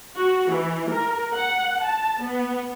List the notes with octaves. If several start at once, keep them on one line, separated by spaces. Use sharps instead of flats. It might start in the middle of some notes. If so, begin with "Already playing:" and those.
F#4
E3
A#4
F#5
A5
B3